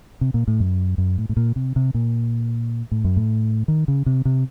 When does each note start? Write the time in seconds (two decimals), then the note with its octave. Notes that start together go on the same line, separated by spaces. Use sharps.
0.21 C3
0.34 A#2
0.48 A2
0.60 F#2
0.98 F#2
1.18 A2
1.29 A2
1.37 A#2
1.56 C3
1.76 C3
1.94 A#2
2.91 A2
3.04 F#2
3.17 A2
3.68 D#3
3.88 C#3
4.06 C3
4.25 C3